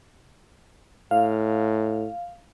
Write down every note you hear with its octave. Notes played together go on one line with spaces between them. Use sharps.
A2 F5